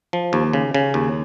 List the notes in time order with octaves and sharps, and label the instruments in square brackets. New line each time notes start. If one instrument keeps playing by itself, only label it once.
[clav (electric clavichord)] F3
D#2
C#3
C#3
D#2